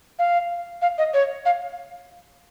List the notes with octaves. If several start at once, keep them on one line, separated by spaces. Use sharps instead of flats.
F5
F5
D#5
C#5
F5